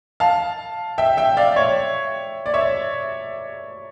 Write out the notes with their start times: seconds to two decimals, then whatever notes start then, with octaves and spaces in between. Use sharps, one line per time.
0.20 F5 A5
0.98 E5 G5
1.17 E5 G5
1.37 D5 F5
1.56 C#5 E5
2.46 D5
2.54 C#5 E5